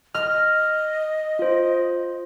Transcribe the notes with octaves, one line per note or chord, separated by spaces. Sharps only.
D#5 F6
F4 C5